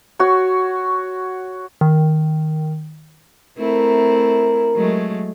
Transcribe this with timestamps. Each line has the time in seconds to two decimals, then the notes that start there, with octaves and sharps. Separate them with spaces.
0.19 F#4 C#5
1.81 D#3
3.58 A3 C4 E4 A#4
4.75 F#3 G#3 A3